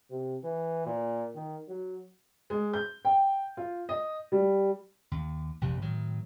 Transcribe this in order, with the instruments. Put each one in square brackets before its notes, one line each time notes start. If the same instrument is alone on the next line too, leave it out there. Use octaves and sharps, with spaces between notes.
[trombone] C3
E3
A#2
D#3
F#3
[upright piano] G#3
G6
G5
F4
D#5
G3
[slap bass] D#2
A#1 F2 C3
A2 D#3 F#3